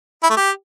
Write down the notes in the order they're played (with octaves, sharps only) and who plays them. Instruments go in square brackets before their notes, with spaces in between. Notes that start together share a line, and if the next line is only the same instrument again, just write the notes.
[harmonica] E4
A3
G4